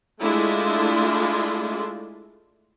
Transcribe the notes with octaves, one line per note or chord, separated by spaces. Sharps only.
G#3 A3 D4 E4 F4